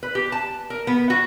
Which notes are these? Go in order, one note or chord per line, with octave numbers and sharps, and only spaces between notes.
B4
G4
A5
A#4
B3
F#4